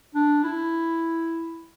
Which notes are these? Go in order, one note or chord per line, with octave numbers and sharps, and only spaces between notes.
D4
E4